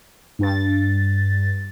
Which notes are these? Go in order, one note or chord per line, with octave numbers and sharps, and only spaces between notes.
G2 A6